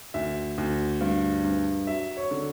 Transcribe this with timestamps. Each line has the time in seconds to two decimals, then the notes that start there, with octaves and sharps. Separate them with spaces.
0.14 D2 E5
0.58 D2
1.00 G2
1.44 G2
1.87 F#3 E5
2.17 C#5
2.31 D3